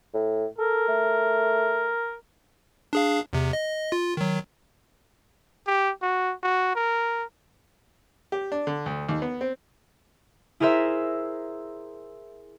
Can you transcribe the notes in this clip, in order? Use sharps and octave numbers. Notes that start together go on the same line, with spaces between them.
A2
A4 A#4
A3
D4 G#4 F5
E2 C3
D#5
F4
D#3 F#3
G4
F#4
F#4
A#4
G4
D4
D3
D2
D#2
B3
C4
E4 G#4 A#4 C5 E5